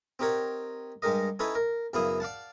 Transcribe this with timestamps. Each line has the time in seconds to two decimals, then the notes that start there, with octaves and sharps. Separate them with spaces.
0.19 C4 D#4 G4 A#4 C#5 F#5
1.02 G2 G#3 G4 A#4 D#5
1.39 C#4 D#4 E4 A4 B4 C#5
1.55 A#4
1.93 F#2 C#3 B3 E4 F5 D#6
2.20 D5 F5 F#5 A5